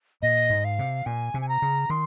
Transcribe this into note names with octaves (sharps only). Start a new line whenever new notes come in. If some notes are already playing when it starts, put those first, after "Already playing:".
A#2 D#5
G#2
F5
C3
A#2 G#5
C3
G#5
A#5
C#3
D#3 C6